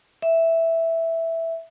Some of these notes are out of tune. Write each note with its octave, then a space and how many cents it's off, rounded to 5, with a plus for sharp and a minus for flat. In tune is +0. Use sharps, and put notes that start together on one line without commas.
E5 +0